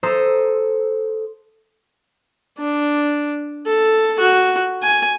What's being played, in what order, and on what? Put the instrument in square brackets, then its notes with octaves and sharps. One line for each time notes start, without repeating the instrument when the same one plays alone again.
[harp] A4 C5 A#5 C6 D#6 E6
[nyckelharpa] D4
A4
F#4
G#5